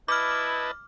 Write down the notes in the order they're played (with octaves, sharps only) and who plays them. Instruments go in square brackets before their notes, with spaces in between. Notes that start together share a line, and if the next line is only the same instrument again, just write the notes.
[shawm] E4 [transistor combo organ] B4 D#5 A5 [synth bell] D6 F6